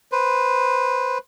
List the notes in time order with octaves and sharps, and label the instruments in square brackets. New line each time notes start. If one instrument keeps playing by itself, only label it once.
[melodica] B4 C5